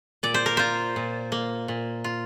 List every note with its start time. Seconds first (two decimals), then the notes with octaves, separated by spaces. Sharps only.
0.23 A#2 D5
0.34 C5
0.46 A#4
0.57 F4 C5
0.96 A#2
1.32 A#3
1.68 A#2
2.04 F4